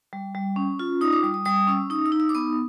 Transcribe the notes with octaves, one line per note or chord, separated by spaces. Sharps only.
G3
G3
C#4
F4
D#4 D#6
D6
G3 D#6
D#6
G3 D#6
C#4 E6
D#4 D#6
E6
D#4
E6
D6
B3 D#6